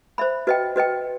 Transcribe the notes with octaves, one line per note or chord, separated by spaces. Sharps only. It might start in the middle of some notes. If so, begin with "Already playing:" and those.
C5 E5 B5
F#4 B4 D#5 G5
F#4 B4 D#5 G5